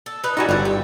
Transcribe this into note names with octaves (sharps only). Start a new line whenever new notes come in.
A4
D#4 B4
G3 D#4 E4 F#4 A4 G#5
G1 G3 C4 F#4
G4